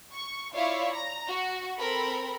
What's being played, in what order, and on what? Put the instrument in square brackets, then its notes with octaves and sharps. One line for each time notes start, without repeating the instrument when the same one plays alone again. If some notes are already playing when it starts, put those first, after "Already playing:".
[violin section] C#6
E4 F4 C#5 D5 E5 F5
A#5
F#4
C4 A4 A#4 B5